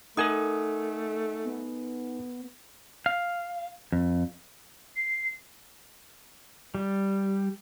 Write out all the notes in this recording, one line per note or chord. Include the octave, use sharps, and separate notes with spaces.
A3 D#4 A4 A#4 F#5 G#5 D#6
B3
F5
F2
C7
G3